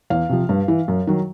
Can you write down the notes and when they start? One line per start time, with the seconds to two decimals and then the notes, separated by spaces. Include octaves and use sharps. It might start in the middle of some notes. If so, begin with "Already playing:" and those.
0.10 E2 F5
0.29 C3 F3
0.49 G2
0.68 E3
0.88 F#2
1.07 D#3 F#3